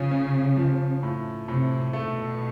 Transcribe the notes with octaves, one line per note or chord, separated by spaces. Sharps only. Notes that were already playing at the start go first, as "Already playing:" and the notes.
Already playing: C#3 F3 C#4
C#4
F3
A2
A2 C3
B2 A3